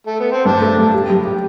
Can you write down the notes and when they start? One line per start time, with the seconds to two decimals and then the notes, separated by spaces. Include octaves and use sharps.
0.07 A3
0.20 B3
0.32 C4
0.45 G2 D4
0.62 A3
0.77 G2
0.94 G4
1.10 G3
1.25 G4